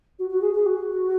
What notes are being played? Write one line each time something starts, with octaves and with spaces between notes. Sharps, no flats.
F#4
F#4
G#4
G#4
F#4